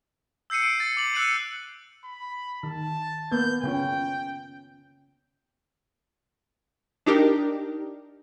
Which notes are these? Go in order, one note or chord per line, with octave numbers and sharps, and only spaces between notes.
E6 G6 C7 C#7 D#7
D7
A6
D6 F#7
E6 F#6 C#7 D#7 F#7
B5
D#3 A5
A#3 B3 B4 G6
C#3 C#4 F4 G5
D4 D#4 G4 A#4